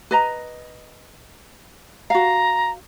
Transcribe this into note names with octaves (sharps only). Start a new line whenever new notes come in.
B4 D#5 A#5
F#4 F5 A#5